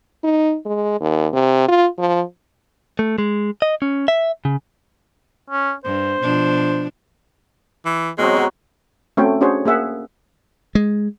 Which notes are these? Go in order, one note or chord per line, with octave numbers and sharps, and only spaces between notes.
D#4
G#3
D#2
C3
F4
F3
A3
G#3
D#5
C#4
E5
C#3
C#4
G2 C5
B2 F3 D4
E3
B2 F#3 G#3 C4
F#3 B5 C#6
A3 C4 C#4 F#4 A4 G5
C#4 D4 F#4 G#4 C5 C#5
A#3 G#4 E5 F#5
G#3